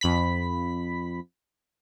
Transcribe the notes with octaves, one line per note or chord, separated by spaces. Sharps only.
F2 B5 B6